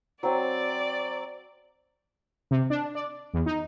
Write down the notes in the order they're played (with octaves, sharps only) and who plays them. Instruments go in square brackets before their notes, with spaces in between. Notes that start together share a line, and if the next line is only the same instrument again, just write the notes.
[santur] F#3 C4 G#5 [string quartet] D5
[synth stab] C3
D4
D5
E2
D#4